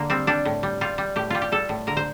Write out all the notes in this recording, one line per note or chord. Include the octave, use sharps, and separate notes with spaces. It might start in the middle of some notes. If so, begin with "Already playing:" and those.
Already playing: D3 A#3
G3 C4
G3 D4
A2
G3
G3 F4
G3
A2 G4
G3 F4
G4
G3 A4
A2
D3 A#4
C5